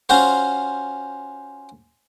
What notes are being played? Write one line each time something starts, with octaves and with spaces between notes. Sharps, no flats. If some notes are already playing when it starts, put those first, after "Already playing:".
C#4 F4 F#4 C5